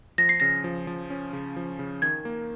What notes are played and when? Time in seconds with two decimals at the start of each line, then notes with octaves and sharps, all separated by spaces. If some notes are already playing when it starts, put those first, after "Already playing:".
0.18 F3 A#6
0.29 C7
0.40 C#3 A#6
0.64 F3
0.87 F3
1.10 C#4
1.33 C#3
1.56 F3
1.79 C#3
2.02 D#3 G#6
2.25 A#3